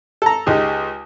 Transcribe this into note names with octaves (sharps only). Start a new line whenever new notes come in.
A4 A#5
C#2 G#3 D#4 G4